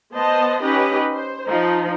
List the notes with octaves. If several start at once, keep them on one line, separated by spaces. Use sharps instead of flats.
B3 C5 D#5 A5
C#4 D#4 G4 B4 D#5
C5
F3 D#4